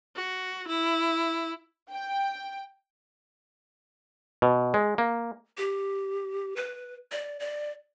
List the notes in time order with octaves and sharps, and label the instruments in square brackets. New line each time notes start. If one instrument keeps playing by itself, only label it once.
[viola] F#4
E4
[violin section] G5
[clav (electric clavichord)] B2
G#3
A#3
[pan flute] G4
B4
D5
D5